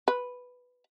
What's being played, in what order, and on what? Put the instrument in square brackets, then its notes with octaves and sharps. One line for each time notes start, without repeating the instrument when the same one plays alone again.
[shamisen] B4